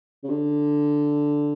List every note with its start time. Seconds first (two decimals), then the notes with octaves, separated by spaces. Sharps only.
0.24 C#3
0.30 D3